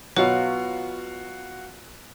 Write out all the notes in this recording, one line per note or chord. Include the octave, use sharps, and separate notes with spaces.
B2 F#3 B3 F4 F#4 C#5 F5